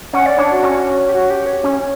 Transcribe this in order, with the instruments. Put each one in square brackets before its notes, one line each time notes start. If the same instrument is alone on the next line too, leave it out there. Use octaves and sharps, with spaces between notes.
[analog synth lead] C#4 [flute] F#5
[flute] D5
[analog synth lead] D4 [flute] C#5
[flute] F#4
[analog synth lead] C#4
[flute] G4
F#4
G4
C#5
[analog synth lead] C#4